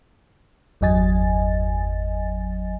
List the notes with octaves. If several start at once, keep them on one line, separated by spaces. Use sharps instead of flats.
G1 E2 F#3 D#5 G#5 A6